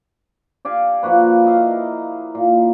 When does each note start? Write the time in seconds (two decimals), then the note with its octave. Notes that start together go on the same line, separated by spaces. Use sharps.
0.65 G4 D5 F5 G#5
1.03 F3 A#3 F#4 B4
1.45 E4 D#5 F5
1.71 A#4
2.35 A#2